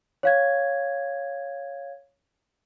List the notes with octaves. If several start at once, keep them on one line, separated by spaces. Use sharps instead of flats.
C#5 F5 G#6